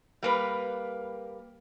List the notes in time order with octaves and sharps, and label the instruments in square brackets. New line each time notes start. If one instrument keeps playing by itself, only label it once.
[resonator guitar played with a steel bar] G3 A#3 B4